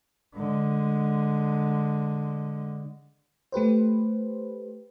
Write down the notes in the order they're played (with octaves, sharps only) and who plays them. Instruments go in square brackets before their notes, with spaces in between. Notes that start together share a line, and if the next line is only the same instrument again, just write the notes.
[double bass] D3 G#3
[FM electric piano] A3 G4 B4 C5